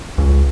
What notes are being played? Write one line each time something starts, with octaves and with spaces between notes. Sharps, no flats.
C#2